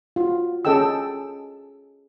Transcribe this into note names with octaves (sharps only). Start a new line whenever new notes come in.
F4 F#4
C#4 G#4 A4 D#5 G5 E6